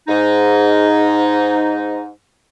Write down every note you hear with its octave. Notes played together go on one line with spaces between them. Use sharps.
G#2 D#4